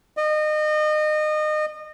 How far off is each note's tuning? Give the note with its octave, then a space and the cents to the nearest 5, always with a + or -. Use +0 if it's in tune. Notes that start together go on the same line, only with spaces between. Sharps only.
D#5 -30